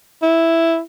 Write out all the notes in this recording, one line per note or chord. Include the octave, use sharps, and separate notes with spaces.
E4